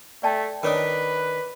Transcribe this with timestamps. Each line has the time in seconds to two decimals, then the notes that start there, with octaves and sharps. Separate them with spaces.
0.23 A3 D5 G5 A5
0.63 D#3 D4 A#4 B4 C#5 D5 D#6